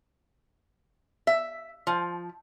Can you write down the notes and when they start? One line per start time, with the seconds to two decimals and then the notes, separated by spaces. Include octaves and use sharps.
1.27 E5
1.87 F3